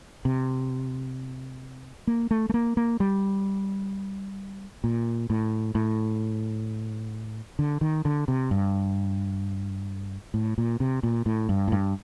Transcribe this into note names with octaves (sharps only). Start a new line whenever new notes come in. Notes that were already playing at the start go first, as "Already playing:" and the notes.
C3
A#3
A3
A3
A#3
A#3
G3
A#2
A2
A2
D3
D#3
D3
C3
G2
A2
A#2
C3
A#2
A2
G2
A2
G2